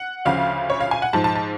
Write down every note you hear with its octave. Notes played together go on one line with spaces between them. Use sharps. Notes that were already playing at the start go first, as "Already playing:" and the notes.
Already playing: F#5
D2 C#3 F3 F5
C#5
F5
G#5
F#5
G#2 F3 A5
A5
A5